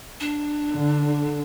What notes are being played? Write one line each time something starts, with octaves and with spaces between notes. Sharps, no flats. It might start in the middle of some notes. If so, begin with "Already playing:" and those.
D4
D3